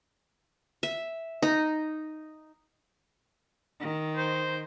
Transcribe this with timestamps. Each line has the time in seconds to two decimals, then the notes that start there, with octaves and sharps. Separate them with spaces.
0.83 E5
1.42 D#4
3.80 D#3
4.17 C5